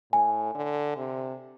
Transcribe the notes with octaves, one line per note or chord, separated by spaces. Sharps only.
A2 G#5
D3
C3